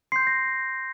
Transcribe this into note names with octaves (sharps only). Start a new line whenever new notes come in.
C6 G6 C7
A#6